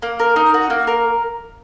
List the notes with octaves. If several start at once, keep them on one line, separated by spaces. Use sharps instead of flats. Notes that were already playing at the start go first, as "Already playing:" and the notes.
A#3
A#4
D#4
F#4
A#3
A#4